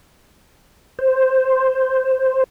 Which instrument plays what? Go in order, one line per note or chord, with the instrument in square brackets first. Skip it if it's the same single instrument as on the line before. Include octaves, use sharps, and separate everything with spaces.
[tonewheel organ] C5